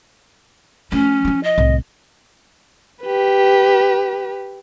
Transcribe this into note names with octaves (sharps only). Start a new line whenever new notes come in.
F3 A3 C#4
F3 E4
D#5
C2 A2
G4 B4